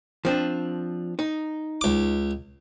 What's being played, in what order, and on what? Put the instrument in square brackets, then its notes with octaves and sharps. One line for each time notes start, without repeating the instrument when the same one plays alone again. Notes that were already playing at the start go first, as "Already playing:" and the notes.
[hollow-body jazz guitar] F3 C4 D4
D#4
[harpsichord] C#2 D6